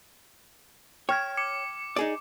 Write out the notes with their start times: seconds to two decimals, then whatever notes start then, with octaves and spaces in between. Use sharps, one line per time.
1.09 C#5 G5 F6 G#6
1.37 D6 C#7
1.96 D#4 G#4 D5